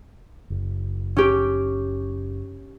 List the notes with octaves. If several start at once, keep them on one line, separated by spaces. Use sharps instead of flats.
F#1
C#4 G4